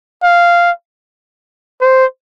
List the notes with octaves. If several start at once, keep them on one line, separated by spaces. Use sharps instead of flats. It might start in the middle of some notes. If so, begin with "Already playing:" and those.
F5
C5